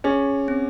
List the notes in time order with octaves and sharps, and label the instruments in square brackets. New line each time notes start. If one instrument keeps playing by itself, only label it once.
[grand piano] C#4 [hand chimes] G#4
[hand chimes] C4